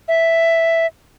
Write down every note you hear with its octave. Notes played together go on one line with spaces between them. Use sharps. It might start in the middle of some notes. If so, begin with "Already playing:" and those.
E5